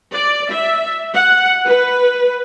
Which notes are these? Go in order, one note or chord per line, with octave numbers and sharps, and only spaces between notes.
D5
E5
F#5
B4